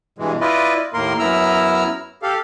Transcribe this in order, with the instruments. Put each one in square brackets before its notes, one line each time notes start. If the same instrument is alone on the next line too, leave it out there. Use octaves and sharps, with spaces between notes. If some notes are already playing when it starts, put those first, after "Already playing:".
[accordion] G2 B2 E3 G#3
E4 F4 B4 D5 D#5
D#2 A2 A#3 A#4 C6
F#2 B3 E4 A#5 E6 F6
G4 A4 F5